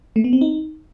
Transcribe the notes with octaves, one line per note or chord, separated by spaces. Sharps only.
A3
B3
C4
D#4